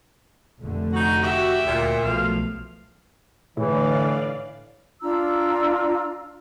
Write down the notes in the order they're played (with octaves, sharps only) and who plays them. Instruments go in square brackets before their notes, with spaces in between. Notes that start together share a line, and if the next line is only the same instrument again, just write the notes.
[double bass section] F1 D3 A3
[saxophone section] D#4 F#4
[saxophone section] F#4 [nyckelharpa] G4 E5
[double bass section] D2 [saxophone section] A#2
[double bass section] B1 F3 A3 [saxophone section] B2 F4 F5
[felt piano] A2 [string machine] D3 D5 F5 [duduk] E3 [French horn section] A4 B4 C#5
[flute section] D4 F4 A#5 E6